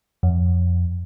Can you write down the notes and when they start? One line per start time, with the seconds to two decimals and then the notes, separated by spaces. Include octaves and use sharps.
0.23 F2